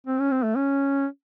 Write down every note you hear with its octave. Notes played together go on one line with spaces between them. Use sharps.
C4
C#4
C4
A3
C#4